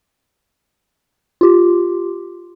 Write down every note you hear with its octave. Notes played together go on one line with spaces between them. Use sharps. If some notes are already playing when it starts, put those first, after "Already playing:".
F4 G4